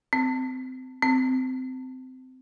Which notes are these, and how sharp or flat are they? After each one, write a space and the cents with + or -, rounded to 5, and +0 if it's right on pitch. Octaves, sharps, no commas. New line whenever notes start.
C4 -25
C4 -20